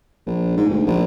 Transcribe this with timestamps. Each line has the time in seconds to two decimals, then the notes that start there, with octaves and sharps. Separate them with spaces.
0.27 A#1
0.57 G#2
0.70 D2
0.86 A#1